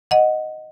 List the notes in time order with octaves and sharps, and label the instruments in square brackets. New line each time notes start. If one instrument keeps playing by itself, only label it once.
[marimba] D#5 F#5